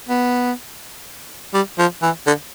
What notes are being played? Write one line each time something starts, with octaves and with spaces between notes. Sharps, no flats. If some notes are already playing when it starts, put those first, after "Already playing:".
B3
G3
F3
E3
D3